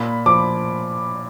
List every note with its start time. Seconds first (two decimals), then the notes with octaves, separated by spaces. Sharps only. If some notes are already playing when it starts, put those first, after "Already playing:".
Already playing: A#2 B5
0.26 F3 D6